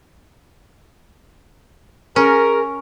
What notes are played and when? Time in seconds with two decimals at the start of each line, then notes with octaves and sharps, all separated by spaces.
2.16 C#4 G#4 A#4